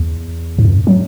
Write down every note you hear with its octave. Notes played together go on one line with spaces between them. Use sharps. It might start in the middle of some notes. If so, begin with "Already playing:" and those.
Already playing: E2
G#2
F#2
F#3